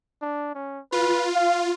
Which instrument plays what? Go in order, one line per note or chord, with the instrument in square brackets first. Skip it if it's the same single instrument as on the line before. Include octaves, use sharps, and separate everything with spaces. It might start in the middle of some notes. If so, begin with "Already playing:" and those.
[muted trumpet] D4
C#4
[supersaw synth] F4 [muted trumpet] B4
[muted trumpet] F5